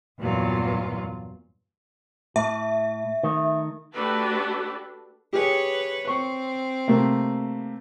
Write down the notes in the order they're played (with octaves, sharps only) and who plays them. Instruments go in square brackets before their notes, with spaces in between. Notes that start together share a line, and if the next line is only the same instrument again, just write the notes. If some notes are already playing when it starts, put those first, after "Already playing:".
[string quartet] E2 G2 A#2 E3 F#3 F4
[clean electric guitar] A2 [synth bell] E5
[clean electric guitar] D#3 A3
[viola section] A3 D4 F#4 G4 A4 B4
[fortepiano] G4 G#4 [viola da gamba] B4 C#5
[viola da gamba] C4 [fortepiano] C#6
[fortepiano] C3 A3 A#3